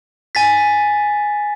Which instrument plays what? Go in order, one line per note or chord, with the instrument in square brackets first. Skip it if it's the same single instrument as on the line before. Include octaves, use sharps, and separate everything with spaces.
[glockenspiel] G#5 A6 B6